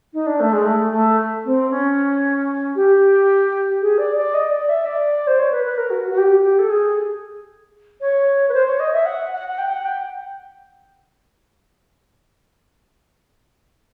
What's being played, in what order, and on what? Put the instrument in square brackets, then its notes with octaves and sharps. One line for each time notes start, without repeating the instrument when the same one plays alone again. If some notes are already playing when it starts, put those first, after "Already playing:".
[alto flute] D#4
D4
A3
G#3
A3
A3
C4
C#4
G4
G#4
D5
D5
D#5
D5
E5
D5
C5
C#5
B4
B4
A#4
F#4
F#4
G4
G4
A4
G#4
C#5
B4
C5
C#5
D#5
E5
F#5
F#5
F#5
G5
F#5
G5